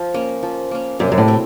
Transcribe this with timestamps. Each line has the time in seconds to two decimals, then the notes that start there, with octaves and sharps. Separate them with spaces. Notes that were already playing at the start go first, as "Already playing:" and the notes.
Already playing: F3
0.14 A#3 C#4
0.43 F3
0.71 A#3 C#4
0.99 F#2 C3
1.12 F#2
1.18 A2
1.28 F#3 C4